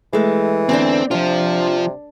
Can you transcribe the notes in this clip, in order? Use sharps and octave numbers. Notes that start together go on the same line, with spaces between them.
E3 G#3 A3
E2 D3 C4 D4
C3 F3 D4 F4